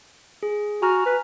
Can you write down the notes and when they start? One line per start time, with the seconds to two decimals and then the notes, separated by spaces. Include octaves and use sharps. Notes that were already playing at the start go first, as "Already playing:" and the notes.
0.43 G#4
0.82 F#4 G#5 A#5 F6
1.06 B4